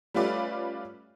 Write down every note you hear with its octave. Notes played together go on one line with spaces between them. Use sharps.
G3 A3 C#4 F4 B4 D5